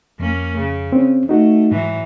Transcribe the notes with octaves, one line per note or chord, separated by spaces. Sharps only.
F2 A#3 C#4
C#3
C4 C#4
A3 D#4 F#4
G#2 E3 F#3